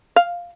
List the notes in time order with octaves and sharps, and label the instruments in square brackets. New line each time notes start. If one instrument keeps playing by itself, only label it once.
[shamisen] F5